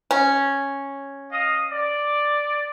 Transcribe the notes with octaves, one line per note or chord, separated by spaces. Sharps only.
C#4
D#5 F5 D#6
D5